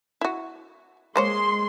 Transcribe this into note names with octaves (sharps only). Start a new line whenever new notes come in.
E4 F#4
G#3 A#3 C5 C#5 C6